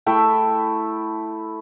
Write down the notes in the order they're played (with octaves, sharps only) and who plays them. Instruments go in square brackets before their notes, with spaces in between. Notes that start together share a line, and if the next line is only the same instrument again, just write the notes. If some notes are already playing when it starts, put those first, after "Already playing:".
[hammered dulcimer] A3 E4 A4 G5